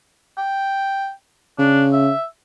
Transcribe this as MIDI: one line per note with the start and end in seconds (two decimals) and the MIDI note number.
0.38 1.11 79
1.59 2.10 49
1.59 1.84 62
1.93 2.23 76